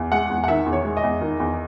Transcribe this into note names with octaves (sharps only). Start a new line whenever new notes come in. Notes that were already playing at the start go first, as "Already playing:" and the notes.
Already playing: E2
G#3 F#5
E2
F#5
D#3 E5
E2
C#5
G#3
D#5
E2
D#3
E2